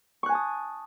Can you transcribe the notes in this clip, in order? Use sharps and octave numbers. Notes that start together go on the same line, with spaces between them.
G#5 A5 C#6 D#6 F#6